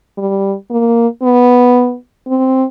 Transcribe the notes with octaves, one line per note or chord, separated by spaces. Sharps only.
G3
A#3
B3
C4